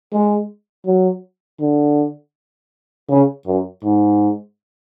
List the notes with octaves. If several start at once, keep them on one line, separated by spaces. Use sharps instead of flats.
G#3
F#3
D3
C#3
F#2
G#2